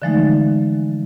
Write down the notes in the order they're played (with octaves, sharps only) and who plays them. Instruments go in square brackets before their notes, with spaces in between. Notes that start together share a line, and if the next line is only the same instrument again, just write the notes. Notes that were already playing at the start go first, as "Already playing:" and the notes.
[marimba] D3 E3 F3 G#3 A3 D#4